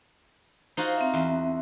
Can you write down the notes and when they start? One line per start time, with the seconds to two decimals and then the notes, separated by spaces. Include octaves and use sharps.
0.77 D#4 F4 F#4 C5
0.98 C4 E5
1.14 E2